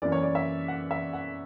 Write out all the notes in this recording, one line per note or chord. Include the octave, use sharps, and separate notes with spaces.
F#2 E3 A#3 D5
C#5
D5
E5
F#5
E5
F#5